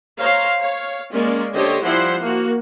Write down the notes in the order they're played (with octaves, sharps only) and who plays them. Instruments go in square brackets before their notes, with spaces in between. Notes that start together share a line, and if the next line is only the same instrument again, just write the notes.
[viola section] C5 C#5 F5 A#5
C#5 F5
G#3 A#3 C#4 A#4 D5 C6
D3 G4 C5 C#5 D#5
F3 G3 E4 C5 F#5 C6
A#3 F#4